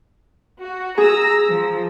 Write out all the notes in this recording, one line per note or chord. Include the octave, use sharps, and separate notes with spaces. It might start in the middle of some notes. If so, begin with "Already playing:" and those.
F#4
G#4 A#5 E6 A#6
F3